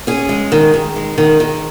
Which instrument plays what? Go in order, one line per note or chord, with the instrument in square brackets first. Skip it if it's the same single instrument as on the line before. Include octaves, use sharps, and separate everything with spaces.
[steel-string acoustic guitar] C#4 G#4
G#3
D#3
D#3
G#3
D#3
D#3